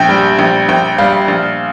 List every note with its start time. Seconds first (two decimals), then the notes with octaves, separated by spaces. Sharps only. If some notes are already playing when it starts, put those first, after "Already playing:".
Already playing: A#1 G5
0.09 G3
0.39 A#1
0.69 A#1 G5
0.98 G3 F5
1.28 A#1